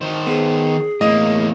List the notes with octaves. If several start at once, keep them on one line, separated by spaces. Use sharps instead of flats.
D#3 C5
B3 G#4
E2 A2 A#3 D#5